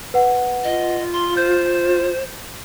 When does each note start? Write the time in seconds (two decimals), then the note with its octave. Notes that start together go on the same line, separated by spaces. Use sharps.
0.14 B4 F#5
0.64 F4 D#5
1.13 C6
1.37 C5 G6